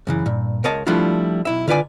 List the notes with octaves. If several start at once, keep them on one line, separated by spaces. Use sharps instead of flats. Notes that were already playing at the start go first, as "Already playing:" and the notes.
F#2 C#3 E3
G2 A#2
C#2 A#4 C#5 D#5 A5
F3 G3 A3 D4 E4 F4
B1 E4 E5
D3 F4 B4 D5 G#5